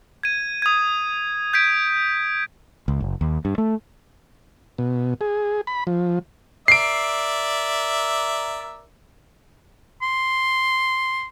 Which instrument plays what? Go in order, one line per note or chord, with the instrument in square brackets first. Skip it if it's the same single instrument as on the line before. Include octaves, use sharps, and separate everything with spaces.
[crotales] G#6 D#7
D#6 G#6
G6 G#6 B6 D7
[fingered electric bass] C#2
F#1
D#2
G2
A3
[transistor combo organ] B2
G#4
B5
F3
[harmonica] A#4 D5 E5 [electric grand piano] C7 D7
[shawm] C6